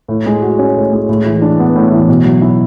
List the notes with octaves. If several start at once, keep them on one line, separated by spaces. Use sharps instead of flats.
A2
G#3
F#4
C#4
A2
G#3
A2
E3
D4
B3
A2
E3
B2
F#3
E4